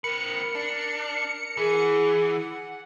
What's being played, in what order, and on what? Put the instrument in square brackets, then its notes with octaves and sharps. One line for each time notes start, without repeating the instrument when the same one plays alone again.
[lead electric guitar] C4 B4 [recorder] A#4 [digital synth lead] C#7
[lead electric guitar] D4
[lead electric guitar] E3 [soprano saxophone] G#4
[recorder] F#5